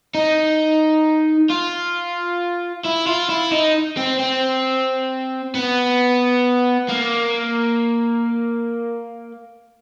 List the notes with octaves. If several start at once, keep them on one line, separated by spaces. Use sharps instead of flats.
D#4
F4
E4
F4
E4
D#4
C4
C4
B3
A#3